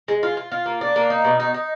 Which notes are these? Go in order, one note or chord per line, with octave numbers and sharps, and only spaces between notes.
G#3
F4
F4
F4
A#3
D4
A#3
D#4
B2
D#4
D#4